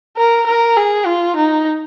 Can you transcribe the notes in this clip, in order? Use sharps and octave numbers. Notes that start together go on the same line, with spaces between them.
A#4
A#4
G#4
F4
D#4